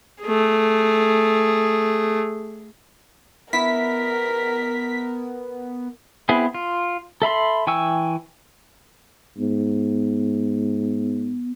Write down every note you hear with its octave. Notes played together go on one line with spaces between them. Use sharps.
A3 G#4
B3 E4 A#4 B6
B3 C4 E4 G#4
F4
A4 E5 B5 C6
E3 G5 G#5 C#6 E6
G#2 B3